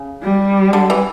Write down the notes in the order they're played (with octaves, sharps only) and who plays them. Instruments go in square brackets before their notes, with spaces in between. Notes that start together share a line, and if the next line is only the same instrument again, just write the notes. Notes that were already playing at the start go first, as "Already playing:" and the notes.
Already playing: [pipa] C#3
[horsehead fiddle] G3
[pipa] D3
E3